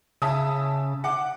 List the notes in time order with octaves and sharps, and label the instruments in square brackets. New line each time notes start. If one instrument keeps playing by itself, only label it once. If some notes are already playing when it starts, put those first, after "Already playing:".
[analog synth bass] C#3 [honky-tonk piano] E5 A5 D#6
[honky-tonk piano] F#5 D6